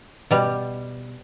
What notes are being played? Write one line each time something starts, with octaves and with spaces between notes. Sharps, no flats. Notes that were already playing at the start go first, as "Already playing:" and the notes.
B2 G3